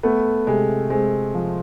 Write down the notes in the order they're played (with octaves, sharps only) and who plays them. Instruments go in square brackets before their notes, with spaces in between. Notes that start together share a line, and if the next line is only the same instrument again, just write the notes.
[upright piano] A3 [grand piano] B3
[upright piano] C3 [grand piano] G#3
[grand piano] G#3 [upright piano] C4
[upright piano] F3